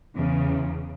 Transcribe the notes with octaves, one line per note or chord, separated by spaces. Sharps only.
E2 C#3